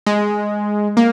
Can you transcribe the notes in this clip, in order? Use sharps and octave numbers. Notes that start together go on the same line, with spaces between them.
G#3
A#3